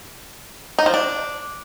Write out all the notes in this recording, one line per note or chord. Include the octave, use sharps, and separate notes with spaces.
D#4
F3
D4